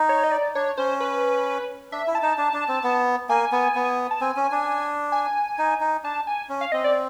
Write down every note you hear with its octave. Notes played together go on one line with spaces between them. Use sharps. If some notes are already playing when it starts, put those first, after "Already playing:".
Already playing: D#4
C#5
D#5
D5
D4 C#5
C#4 C5
B4
D4 E5
E4
A5
D#4
D4
D4
C4
B3
A#3 G#5
B3
B3
A5
C4 G#5
C#4
D4
G#5
D#4
D#4
D4 A5
G#5
C#4
F5
C4 D#5
D5